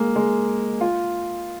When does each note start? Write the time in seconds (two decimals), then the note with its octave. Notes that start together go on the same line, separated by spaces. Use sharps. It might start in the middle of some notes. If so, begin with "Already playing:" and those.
Already playing: G#3 A#3
0.16 G#3
0.81 F4